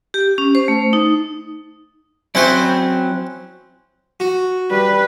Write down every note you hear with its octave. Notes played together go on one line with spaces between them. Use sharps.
G4
C#4
C5
A3
D#4
F#3 C4 C#4 E4 C5
F#4
G3 B4